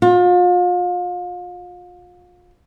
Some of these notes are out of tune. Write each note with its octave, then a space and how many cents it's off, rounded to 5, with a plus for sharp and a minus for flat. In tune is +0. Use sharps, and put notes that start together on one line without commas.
F4 +35